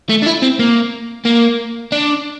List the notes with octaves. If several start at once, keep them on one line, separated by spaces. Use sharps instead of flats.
A3
D4
E4
C4
A#3
A#3
D4